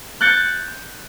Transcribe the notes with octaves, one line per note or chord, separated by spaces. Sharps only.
F#6 G6 A6 C#7